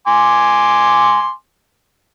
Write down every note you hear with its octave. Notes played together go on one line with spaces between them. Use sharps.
G#5 C6 D6